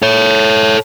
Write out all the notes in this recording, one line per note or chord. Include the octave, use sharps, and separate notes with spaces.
A4 C#5